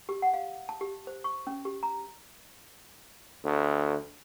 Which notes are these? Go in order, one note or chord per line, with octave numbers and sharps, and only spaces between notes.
G4
F#5
F5
A5
G4
C5
C#6
C#4
G4
A#5
D2